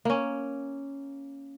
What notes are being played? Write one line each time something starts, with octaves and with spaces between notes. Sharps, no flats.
A#3 C#4